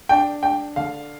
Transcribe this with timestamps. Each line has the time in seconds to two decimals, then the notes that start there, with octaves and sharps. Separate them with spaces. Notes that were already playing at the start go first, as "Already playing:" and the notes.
0.09 D4 G5
0.43 D4 G5
0.76 D3 F5